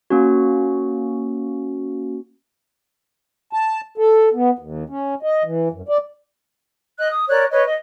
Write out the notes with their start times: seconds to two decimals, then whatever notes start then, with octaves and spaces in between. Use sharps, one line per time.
0.10 A#3 C#4 F#4
3.53 A5
3.98 A4
4.34 B3
4.59 D#2
4.89 C#4
5.23 D#5
5.44 E3
5.72 F#2
5.89 D5
6.99 D#5 F#6
7.10 D#6
7.28 A#4 C#5 D5 F#6
7.51 B4 C#5 D#5
7.65 D#5